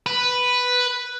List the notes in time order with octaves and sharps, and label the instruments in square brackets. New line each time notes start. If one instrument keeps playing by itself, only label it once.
[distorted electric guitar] B4